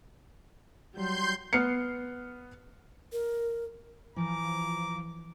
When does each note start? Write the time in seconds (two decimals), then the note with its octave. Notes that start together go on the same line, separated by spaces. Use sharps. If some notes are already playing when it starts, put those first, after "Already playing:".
0.94 F#3 G3 C6 G6
1.53 B3 F6 C7 C#7
3.12 A#4
4.16 E3 F3 A#5 D6